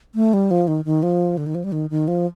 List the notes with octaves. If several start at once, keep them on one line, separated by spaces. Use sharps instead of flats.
A3
G3
F3
D#3
D#3
F3
D3
D#3
F3
G3
D#3
D#3
F3